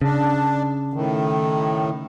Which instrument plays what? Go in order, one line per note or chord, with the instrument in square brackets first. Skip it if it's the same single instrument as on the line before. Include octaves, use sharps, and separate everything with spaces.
[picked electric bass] C#3 [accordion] D4
[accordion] A2 D#3